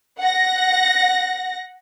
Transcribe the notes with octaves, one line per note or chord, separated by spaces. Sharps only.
F#5 A#6